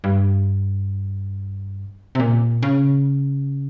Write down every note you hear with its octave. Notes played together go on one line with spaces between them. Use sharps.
G2
C3
A#2
C#3